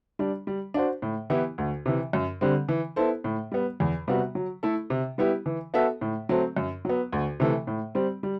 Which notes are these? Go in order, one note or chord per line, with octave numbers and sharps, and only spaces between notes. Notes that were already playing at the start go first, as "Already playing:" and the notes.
G3 D4
G3
D4 F#4 C5
A2
E3 B3 E4 G4
D2
C3 E3
F#2
D3 G3 C4
E3
B3 E4 A4 C5
A2
G3 B3
E2
C3 G3 B3 F#4
F#3
A3 E4 A4
C3
G3 B3 E4 G4
E3
B3 F#4 A4 E5
A2
F#3 A3 C4
F#2
F#3 B3
D2
C3 E3 A3
A2
G3 C4
G3